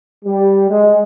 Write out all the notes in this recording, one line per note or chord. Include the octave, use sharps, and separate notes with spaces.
G3
G#3